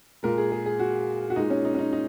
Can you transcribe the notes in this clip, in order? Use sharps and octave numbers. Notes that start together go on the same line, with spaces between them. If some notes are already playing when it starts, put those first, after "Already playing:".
A#2 G#3 A#4
G#4
G#4
G#4
F#4
F#4
A#2 G#3 D#4
C#4
D#4
C#4
D#4
D#4